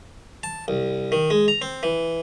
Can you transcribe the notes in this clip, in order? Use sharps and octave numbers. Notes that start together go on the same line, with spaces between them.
A5
C2
D#3
G#3
A#5
C4
E3